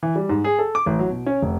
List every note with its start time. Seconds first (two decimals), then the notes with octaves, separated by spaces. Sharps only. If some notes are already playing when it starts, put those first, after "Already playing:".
0.03 E3
0.16 G3
0.29 G#2
0.44 G#4
0.59 A4
0.75 D6
0.86 A1
0.99 F#3
1.10 B2
1.26 C#4
1.42 F1